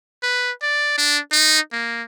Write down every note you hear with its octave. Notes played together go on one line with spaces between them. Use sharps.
B4
D5
D4
D#4
A#3